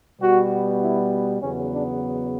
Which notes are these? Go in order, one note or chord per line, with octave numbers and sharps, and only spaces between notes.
B2 G3 B3 F#4
E4
E2 C#3 F#3 B3 C#4
D4